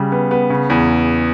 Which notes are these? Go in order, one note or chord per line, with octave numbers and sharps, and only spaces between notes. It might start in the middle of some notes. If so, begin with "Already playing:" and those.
Already playing: C#3 G3
B3
B3
C#3
E2